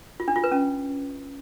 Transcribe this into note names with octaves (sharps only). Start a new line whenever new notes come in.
F4
D4
F4
B4
C#4